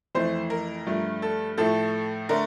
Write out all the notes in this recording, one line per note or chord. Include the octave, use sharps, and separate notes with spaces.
F2 E3 A3 C5
A#4
G2 F3 A3
A4
A2 F3 A3 A4
D3 A3 A#4